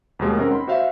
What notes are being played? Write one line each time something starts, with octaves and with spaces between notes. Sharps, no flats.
D#2 B2 G#3 A#3
G#3 C4 C#4 D#4 A#4 F#5
B5 C6
F#4 C5 E5 F5